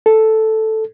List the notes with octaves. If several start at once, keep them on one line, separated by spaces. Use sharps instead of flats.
A4